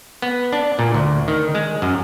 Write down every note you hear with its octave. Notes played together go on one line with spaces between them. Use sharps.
B3
D4
A#2
D2
D#3
G#3
F#2